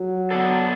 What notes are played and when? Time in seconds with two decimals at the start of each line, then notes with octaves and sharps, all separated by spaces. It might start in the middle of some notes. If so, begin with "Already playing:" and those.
Already playing: F#3
0.31 B3 D4 A4